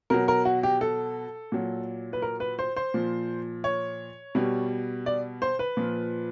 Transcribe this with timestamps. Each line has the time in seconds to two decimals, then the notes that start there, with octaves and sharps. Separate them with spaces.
0.10 B2 F#3 A#4
0.28 A#4
0.45 F#4
0.63 G4
0.81 A4
1.52 A#2 F#3
2.13 B4
2.22 A#4
2.40 B4
2.59 C5
2.76 C5
2.94 A#2 F3
3.64 C#5
4.35 B2 G3
5.06 D5
5.42 C5
5.59 B4
5.77 A#2 F3